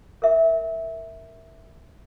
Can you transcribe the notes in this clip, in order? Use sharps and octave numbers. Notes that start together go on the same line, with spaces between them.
A#4 E5